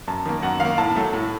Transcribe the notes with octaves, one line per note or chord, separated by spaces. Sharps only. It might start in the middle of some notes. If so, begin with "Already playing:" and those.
F#2 A5
D#3 A#3
F#2 F#5
D#3 A#3 F5
A2 A5
F#3 A3
A2